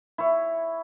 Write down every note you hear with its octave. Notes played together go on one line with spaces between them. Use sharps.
E4 C#5